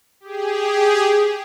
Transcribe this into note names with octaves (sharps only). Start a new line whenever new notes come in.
G4 G#4